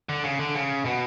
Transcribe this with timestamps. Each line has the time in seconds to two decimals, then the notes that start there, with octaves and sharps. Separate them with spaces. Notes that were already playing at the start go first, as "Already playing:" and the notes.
0.09 D3
0.24 C#3
0.39 D3
0.55 C#3
0.85 B2